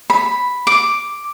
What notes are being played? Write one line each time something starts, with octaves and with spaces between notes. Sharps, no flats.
B5
D6